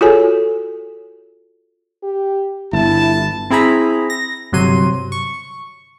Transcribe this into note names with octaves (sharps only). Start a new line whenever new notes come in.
F4 F#4 G#4 A4 C#5 G#5
G4
G1 E4 A5
C4 E4 G#4 A#5 B5
A#6
G1 C3 F#3 C6 D#7
C#6